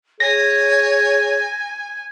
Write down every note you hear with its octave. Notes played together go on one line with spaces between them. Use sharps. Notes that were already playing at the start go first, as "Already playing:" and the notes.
G#4 C#5 G#5 A#6